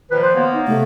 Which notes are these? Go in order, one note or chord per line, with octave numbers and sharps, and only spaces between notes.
A#2 D#3 F3 B4
C5
F#3 A#3 B3
D#4
C3 A3